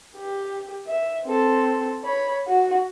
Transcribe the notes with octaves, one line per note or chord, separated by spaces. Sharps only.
G4
E5
C4 A4
C#5 B5
F#4 F#5